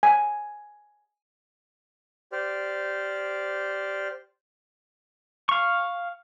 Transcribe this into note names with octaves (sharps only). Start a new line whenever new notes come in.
G#5
G4 C5 D5 F6
F5 C#6